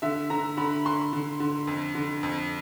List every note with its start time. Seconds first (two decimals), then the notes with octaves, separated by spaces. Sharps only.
0.02 D3 E5
0.30 D3 A#5
0.57 D3 B5
0.85 D3 C6
1.13 D3
1.40 D3
1.67 F2
1.95 D3
2.23 F2